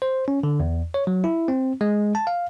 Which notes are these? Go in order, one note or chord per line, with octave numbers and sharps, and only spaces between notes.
C5
C#4
D3
E2
C#5
F#3
E4
C4
G#3
A5
F5